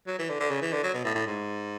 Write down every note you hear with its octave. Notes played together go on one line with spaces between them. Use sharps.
F#3
E3
D3
D3
C#3
E3
D3
F#3
B2
A2
A2
G#2